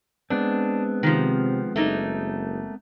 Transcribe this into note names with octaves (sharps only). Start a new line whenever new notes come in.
G#3 B3 C4 D4
C3 D#3 F3
F#1 A3 A#3 D#4